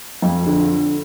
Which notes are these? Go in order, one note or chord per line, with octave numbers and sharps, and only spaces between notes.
F2
D3